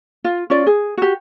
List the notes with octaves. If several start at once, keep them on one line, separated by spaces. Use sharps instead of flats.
F4
C#4 F4 D5
G#4
F#4 G4